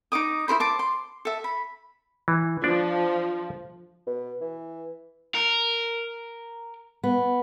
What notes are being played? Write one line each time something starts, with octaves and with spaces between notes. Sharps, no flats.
D#4 A4 D6 D#6
E4 A#4 C5 B5
C5 A5 D6
C6
A4 E5
B5
E3
F3 D4 D5
B2
E3
A#4
B3